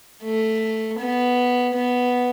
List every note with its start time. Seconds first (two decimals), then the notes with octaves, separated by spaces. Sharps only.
0.23 A3
0.98 B3
1.74 B3